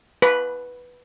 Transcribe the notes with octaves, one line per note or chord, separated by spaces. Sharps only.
B4